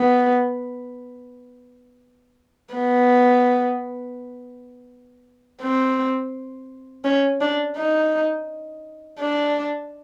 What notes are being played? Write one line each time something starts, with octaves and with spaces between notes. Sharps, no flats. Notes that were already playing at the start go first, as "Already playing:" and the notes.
Already playing: B3
B3
C4
C#4
D4
D#4
D4